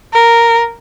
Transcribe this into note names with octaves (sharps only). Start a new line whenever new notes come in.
A#4